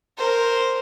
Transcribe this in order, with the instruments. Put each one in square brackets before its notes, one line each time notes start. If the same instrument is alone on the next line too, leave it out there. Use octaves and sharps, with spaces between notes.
[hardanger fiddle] A#4 C5